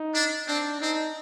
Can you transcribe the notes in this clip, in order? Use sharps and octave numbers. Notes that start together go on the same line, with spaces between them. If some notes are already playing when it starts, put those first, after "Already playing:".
Already playing: D#4
D4
C4 D4
C4 D#4